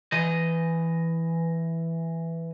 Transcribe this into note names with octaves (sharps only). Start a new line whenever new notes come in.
E3 D#5